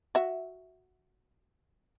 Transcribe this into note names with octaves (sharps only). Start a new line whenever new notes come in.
F#4 E5